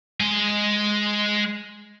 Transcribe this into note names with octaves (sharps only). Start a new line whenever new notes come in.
G#3 G#5